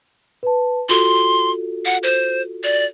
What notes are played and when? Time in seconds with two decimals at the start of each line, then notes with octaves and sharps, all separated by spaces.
0.43 B4 A5
0.89 F4 F#4 A4 C6
1.86 F#5
2.03 C5
2.64 D5